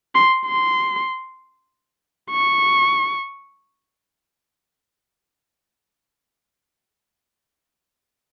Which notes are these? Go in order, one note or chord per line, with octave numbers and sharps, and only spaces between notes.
C6
C6
C#6